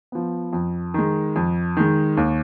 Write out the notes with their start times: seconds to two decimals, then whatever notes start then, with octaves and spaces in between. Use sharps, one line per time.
0.12 F3 B3
0.53 F2
0.94 D#3 G#3
1.36 F2
1.77 D#3 G#3
2.17 D#2